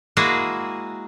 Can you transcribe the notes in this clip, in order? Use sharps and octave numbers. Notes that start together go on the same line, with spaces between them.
G#3 A#3 E4 F#4 G#4